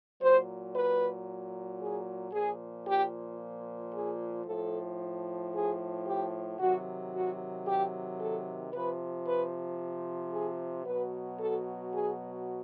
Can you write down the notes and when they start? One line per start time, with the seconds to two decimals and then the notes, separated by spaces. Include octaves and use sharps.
0.21 A#2 F#3 C5
0.74 B4
1.79 G#4
2.33 A#2 F3 G#4
2.86 G4
3.92 G#4
4.46 A2 F3 A4
5.53 G#4
6.06 G4
6.58 C3 D#3 F#3 F#4
7.13 F#4
7.65 G4
8.19 A4
8.72 C3 F3 B4
9.25 B4
10.31 G#4
10.85 B2 F#3 B4
11.38 A4
11.92 G#4